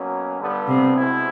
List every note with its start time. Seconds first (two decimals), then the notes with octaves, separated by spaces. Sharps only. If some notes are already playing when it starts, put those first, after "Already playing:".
Already playing: B2 F#3 A#3 C#4
0.39 G2 D3 G3 B3
0.68 C3
0.96 C2 B2 G#3 C4 E4